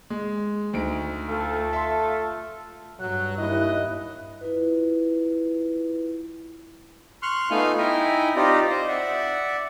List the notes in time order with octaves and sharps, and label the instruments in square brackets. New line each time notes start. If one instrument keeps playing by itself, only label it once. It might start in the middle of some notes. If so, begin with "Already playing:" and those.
[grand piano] G#3
D2 D#4 D7
[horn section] A3 F4 A4
[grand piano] E5 C6
[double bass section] G2 [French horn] F#3 [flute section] F#6
[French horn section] D#2 E4 [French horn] D#5
[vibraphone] E4 F4 B4
[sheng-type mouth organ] C6 C#6 F6 F#6
A3 B3 D#4 F4 F5 G#5
D#4 E4 E5 G5 G#5 A#5
C4 D#4 F4 G4 D5 A#5
C5 D#5
D5 E5 F#5